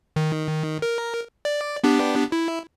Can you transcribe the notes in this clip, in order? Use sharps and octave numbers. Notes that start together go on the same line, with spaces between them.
D#3
A#4
D5
B3 D4 G4
E4